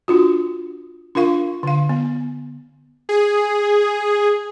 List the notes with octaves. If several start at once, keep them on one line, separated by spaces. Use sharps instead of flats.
D4 F4 F#4
D4 F4 A#4 F5 C#6
D3 F5
B3
G#4